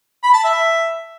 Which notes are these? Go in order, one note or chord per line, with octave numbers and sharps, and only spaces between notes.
B5
A5
E5